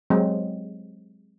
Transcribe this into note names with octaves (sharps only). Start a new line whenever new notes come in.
F#3 G#3 C4